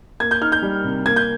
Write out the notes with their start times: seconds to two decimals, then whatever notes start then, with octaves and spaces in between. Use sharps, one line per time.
0.20 A#3 G#6
0.31 G6
0.41 D#4 F6
0.52 G6
0.62 G3
0.84 C3
1.06 A#3 G#6
1.16 G6